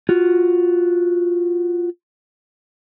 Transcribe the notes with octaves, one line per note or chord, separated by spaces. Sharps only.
F4 F#4